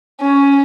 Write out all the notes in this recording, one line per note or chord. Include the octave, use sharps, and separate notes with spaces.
C#4